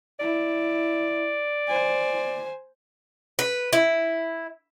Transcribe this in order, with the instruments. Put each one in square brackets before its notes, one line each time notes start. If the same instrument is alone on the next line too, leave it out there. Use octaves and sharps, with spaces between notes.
[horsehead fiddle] E4 [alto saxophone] D5
[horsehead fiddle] C5 G#5
[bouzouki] B4
E4